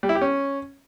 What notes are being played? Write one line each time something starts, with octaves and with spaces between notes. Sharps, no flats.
G3
E4
G4
C#4